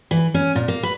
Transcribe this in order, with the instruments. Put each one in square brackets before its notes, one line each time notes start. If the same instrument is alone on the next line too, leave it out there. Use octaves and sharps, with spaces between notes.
[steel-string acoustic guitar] E3
C#4
A#2
A#3
B4